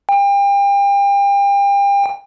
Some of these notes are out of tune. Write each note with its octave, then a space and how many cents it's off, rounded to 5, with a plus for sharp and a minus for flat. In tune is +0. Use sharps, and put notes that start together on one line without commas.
G5 +35